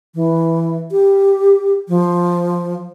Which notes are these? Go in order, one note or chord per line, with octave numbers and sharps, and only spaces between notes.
E3
G4
F3